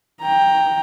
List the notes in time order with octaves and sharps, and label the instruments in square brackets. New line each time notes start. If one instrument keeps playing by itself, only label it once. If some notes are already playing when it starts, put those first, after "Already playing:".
[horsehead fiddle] G5 A#5